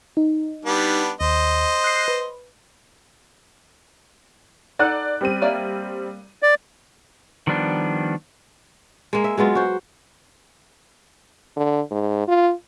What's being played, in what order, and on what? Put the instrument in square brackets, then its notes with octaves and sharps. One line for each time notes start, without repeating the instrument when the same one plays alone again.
[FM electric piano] D#4
[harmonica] G3 B3 D4
[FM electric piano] D#2 [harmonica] C5 D#5
[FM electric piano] F#6 C7
B4
[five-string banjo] D#4 A4 F#5 [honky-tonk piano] D5 F#6
[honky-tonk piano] G3 C4 D#7
[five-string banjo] A#3 D5 E5
[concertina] D5
[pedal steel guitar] D#3 F3 G3 B3 D4
[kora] G#3 A#3
E5
F#3 G#3 B3 F4
F#4 C5
[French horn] D3
G#2
F4